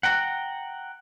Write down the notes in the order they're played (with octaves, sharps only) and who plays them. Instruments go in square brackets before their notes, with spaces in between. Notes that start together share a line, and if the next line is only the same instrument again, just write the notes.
[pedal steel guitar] F#5 G5 A#5